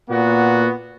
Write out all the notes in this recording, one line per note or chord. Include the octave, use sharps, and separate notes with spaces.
A#2 A#3 B3 F#4